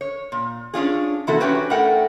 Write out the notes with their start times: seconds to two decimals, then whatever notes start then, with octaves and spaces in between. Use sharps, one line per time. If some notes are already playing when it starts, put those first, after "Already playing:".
0.01 C#5
0.32 A#2
0.74 C#4 D4 F4 G#4
1.27 C3 E3 A#3 E4 F#4 A4
1.40 C#4 D4 F#4 G4 B4 C#5
1.70 A2 A3 A#4 F#5 G5